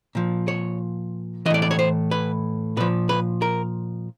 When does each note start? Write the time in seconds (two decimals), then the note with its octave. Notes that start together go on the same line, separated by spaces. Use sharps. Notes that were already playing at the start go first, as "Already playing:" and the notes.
0.15 A#2 F3
0.48 C#5
1.46 E3 D#5
1.50 A2 D5
1.62 D5
1.71 C#5
1.79 C5
2.11 B4
2.77 A#2 F3 B4
3.09 B4
3.42 A#4